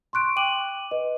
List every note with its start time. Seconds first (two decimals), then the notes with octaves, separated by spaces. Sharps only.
0.13 C6 C#6 F#6 D7
0.36 G5 D6 D#7 F#7
0.91 B4 D#5